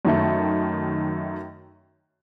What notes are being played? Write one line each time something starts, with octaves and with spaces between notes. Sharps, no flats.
F#2 D#3 A3